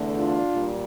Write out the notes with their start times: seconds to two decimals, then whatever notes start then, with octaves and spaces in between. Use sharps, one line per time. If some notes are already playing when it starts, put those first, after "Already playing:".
Already playing: E2 D3 A3
0.18 D4 F4
0.54 A#2 G3